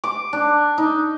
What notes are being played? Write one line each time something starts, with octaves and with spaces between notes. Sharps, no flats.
D6
D4
D#4